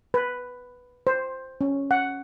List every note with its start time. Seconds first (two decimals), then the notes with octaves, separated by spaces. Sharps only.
0.14 B4
1.07 C5
1.61 C#4
1.91 F#5